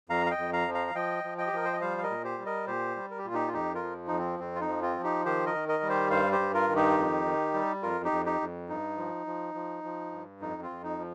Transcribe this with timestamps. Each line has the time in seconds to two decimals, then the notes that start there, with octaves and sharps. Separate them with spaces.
0.09 F2 F5 A#5
0.26 F5
0.31 D#5 G5
0.38 F2
0.53 F5 A#5
0.67 F3
0.74 F5 A#5
0.87 F5
0.95 F3 D#5 G5
1.24 F3
1.38 D#5 G5
1.47 G4
1.53 F3 A#4
1.65 C5
1.73 D#5
1.81 G3 C5 F5
1.98 F5
2.03 A#4 D#5
2.10 A#2
2.24 G4 C5
2.38 G3
2.46 A#4 D#5
2.67 A#2 G4 C5
2.96 G3
3.11 A#4
3.18 G4
3.25 A#2 F4
3.34 D#4 G4
3.48 F4
3.53 F2 D#4 G4
3.75 F4 A#4
3.83 F3
4.08 F2 D#4
4.18 C4
4.39 F2 C4
4.55 F4
4.61 D#4
4.68 F3
4.82 C4 F4
4.96 F3
5.03 D#4 G4
5.25 D#3 G4 C5
5.46 A#4 D#5
5.54 D#3
5.68 A#4 D#5
5.83 G3
5.89 G4 C5
6.11 G2 C5 F5
6.32 G4 C5
6.39 G2
6.54 F4 A#4
6.69 D#3
6.76 D#4 G4
6.98 F2
7.25 D#3
7.54 G3
7.83 F2 F4 A#4
8.04 D#4 G4
8.11 F2
8.26 D#4 G4
8.41 F2
8.69 G2 D#4
8.97 F3
9.27 F3
9.55 F3
9.84 F3
10.12 G2
10.40 F2 D#4
10.62 C4 F4
10.70 F2
10.83 D#4
10.99 F3